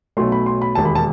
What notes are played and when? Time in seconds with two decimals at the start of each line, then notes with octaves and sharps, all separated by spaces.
0.17 B1 B2 F#3 A3 C6
0.32 B5
0.46 C6
0.62 B5
0.75 E1 D#2 D#3 A5
0.85 B5
0.95 A5